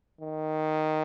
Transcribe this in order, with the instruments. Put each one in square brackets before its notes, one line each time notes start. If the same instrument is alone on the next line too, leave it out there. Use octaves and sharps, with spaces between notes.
[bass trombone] D#3